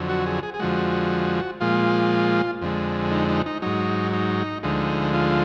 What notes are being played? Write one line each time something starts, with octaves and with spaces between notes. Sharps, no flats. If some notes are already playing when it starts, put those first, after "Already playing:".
Already playing: F2 D3 F#3
F#4
G#4
G#4
G#4
F2 D3 F3 G#3 F#4
A#2 F3 G#3 F4
F2 D3 G#3
D#4
D#4
D#4
G#2 F#3 D#4
D#4
D2 D3 F3 G#3 D#4
F4